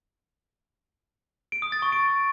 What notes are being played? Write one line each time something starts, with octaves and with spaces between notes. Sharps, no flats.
D7
D#6
A6
C#6
D7